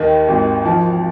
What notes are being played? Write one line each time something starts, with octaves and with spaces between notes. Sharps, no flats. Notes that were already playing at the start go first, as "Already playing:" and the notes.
Already playing: D#2 D#3
G#1
F3